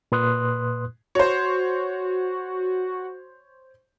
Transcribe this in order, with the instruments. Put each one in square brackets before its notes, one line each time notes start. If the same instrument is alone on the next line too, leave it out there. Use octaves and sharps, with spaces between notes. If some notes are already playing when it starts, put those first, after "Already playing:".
[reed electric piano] A#2 B4 C6 D#6 F#6
[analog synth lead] F#4 [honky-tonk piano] C5 C#5